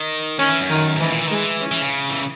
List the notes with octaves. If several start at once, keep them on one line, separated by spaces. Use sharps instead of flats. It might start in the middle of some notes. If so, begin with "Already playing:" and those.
Already playing: D#3
D#3 C#4
E3
F#2
D#3
F#2
G#2 E3
A#2
E3
D#3
G#3
E3
C#4
E3
C#3
E3